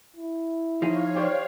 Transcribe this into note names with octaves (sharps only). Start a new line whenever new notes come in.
E4
F3 D#4 G#4 C#5 F5
G4 C5 D5